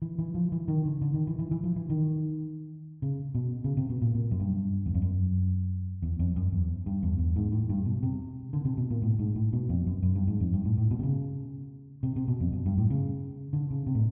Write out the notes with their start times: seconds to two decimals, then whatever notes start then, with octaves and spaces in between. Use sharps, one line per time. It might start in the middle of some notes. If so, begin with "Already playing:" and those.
0.02 E3
0.19 E3
0.35 F3
0.52 E3
0.68 D#3
0.85 D3
1.02 D3
1.14 D#3
1.27 E3
1.39 E3
1.51 E3
1.64 F3
1.76 E3
1.89 D#3
3.02 C#3
3.35 B2
3.64 C#3
3.77 C3
3.90 B2
4.02 A#2
4.15 A#2
4.31 F#2
4.40 G2
4.86 E2
4.94 F2
5.02 F#2
6.02 E2
6.19 F2
6.36 F#2
6.52 E2
6.86 G2
7.03 E2
7.18 E2
7.36 G#2
7.52 A2
7.69 G2
7.86 B2
8.03 C3
8.53 D3
8.65 C3
8.77 B2
8.90 A#2
9.02 A2
9.19 G#2
9.36 A2
9.53 B2
9.69 F2
9.86 F#2
10.03 F#2
10.15 G2
10.27 G#2
10.40 F2
10.53 G2
10.65 A2
10.78 A2
10.91 B2
10.99 C3
11.03 C#3
12.03 C3
12.16 C3
12.28 B2
12.40 F2
12.53 F#2
12.66 G2
12.78 A2
12.90 C#3
13.53 D3
13.71 C#3
13.87 C3
13.95 A2